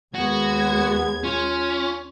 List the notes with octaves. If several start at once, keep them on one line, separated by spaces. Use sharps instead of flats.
D#2 G#3 B3 F#4 G#6
C#4 F4